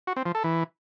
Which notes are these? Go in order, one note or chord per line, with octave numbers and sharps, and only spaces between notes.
F#4
C4
F3
A4
E3